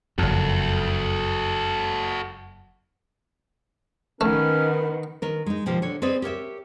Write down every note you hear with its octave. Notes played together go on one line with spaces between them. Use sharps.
F#1 F2 F#4 A4
D#3 A3 B3 C#4 D#4 A#4 B4
D#3 A#4 B4
G#3 D#4
B2 D#3 F3 D#4 G4
D3 C#5
C4 G#4 B4 D5 D#5
G4 A#4 C#5 E5